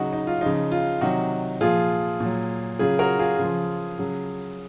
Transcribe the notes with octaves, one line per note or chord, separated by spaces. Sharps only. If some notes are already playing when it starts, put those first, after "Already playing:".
Already playing: C#3 F#3 D#4 F#4
D#4
F4
C#3 F3 D#4
F4
C3 D#3 F#3 D#4 F#4
A#2 F3 F4 G#4
A#2 F#3
C#3 F#3 F4 G#4
F#4 A#4
F4 G#4
C#3 F3
C#3 F#3